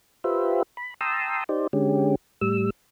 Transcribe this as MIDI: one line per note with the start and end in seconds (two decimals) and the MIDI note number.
0.24 0.63 65
0.24 0.63 67
0.24 0.63 71
0.24 0.63 72
0.24 0.63 76
0.77 0.94 83
1.01 1.44 79
1.01 1.44 81
1.01 1.44 82
1.01 1.44 84
1.01 1.44 87
1.01 1.44 88
1.49 1.67 63
1.49 1.67 67
1.49 1.67 72
1.49 1.67 74
1.73 2.15 50
1.73 2.15 56
1.73 2.15 61
1.73 2.15 67
2.41 2.70 45
2.41 2.70 55
2.41 2.70 88